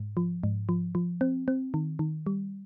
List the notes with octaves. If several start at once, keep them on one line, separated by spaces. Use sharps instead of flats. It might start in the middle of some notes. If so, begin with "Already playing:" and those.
Already playing: G#2
F3
G#2
F3
F3
C4
C4
D#3
D#3
G3